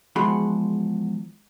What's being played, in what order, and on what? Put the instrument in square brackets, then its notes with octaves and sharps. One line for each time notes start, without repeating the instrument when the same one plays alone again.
[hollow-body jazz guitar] E2 F3 G#3 F#4 B5 C6